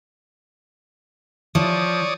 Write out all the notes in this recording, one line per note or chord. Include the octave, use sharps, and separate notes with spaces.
F3 C#5 D5 D#6